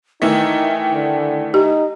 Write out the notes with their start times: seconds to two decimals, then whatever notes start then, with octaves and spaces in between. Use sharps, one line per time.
0.22 D#3 E3 A3 D#4 G5
0.93 D3
1.54 D#4 G4 D#5